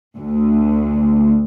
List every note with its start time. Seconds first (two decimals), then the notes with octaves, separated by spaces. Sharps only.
0.16 D2